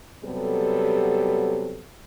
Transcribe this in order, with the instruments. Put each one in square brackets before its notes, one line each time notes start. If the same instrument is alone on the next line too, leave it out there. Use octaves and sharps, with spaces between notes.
[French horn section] C3 F#3 G3 B3 A4